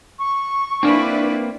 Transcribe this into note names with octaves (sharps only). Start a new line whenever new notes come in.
C#6
A#3 C4 D4 E4 B4 D5